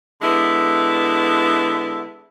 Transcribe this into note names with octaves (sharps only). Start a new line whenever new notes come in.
D3 G#3 B3 E4